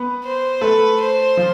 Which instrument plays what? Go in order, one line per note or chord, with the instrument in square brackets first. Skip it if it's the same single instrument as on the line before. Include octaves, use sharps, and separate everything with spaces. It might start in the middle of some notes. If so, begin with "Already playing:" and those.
Already playing: [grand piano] B3 B4
[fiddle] C5
[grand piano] A3 A4 [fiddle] B4
[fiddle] C5
[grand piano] F3 F4